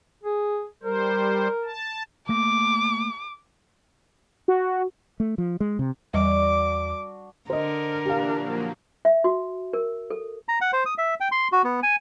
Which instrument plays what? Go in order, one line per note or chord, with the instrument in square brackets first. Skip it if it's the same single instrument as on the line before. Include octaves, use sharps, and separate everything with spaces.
[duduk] G#4
[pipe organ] G3 C5 [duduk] A#4
[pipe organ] A5
[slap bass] A3 A#3 [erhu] D6
[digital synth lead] F#4
[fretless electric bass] A3
F3
G#3
C3
[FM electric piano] E2 [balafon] G3 D#5 [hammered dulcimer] D4 F#4 [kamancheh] D6
[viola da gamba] D3 [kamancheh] A#4 [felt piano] C5 D#5
[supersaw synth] A#2 E3 D4 [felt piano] G4 F5
[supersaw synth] F3 F#3 A#3
[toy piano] E5
F#4
A#4
A4
[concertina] A#5
F#5
C5
D#6
E5
G5
C6
F#4
B3
G#5